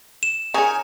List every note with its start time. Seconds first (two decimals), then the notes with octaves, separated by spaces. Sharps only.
0.23 E7
0.54 C#3 D#4 G#4 A#4 C#5 G#5